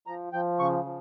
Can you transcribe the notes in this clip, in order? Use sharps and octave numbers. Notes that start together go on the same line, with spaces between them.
F3 A#5
F3 G5
C#3 C#6
F3